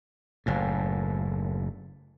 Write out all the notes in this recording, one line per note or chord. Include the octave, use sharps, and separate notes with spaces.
F#1 A2